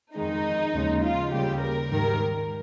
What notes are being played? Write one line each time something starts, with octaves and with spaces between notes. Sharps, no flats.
F2 D#3 G#3 D#4
D#2 C#3 F3 G#3
F4
D#2 C#3 G3 G4
A#4
G#2 D#3 G3 A#4